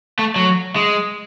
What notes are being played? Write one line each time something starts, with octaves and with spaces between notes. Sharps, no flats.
A3
F#3
G#3